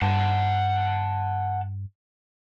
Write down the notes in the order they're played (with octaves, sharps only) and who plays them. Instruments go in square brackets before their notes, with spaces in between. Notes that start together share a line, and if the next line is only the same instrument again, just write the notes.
[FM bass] G2 [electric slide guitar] F#5 A5